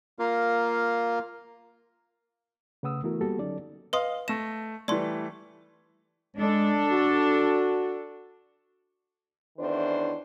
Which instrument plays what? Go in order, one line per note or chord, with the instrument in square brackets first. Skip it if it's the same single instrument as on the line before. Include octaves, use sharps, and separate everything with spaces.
[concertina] A#3 F4 A#4
[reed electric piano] C#3 A3 B4 F#5 D#6 E6
E3 A3 B3 E4 F#4 A#4
G3 A#3 B3 F#4 G4 A4
D3 F#3 C#4 D#4 A4 D5
[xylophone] B4 C6 D#6 [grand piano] D#5 F5
[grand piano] A3 A#6 [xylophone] E7
[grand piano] E3 G3 A3 [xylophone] D5 C6
[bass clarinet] G#3 [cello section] D4 A4
[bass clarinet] F#4
[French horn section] E2 D#3 C#4 D4 E4 C5